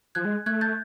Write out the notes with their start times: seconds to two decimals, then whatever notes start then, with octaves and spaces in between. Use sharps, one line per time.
0.15 F3 F#6 G#6
0.25 G#3
0.46 A3 F#6 G#6
0.61 G6 A6